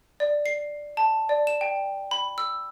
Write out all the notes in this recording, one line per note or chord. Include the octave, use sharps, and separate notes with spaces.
D5
C7
A5
D5
E7
G5
B5
E6